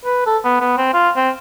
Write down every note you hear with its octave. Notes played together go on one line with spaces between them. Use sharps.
B4
A4
B3
B3
C4
F4
C4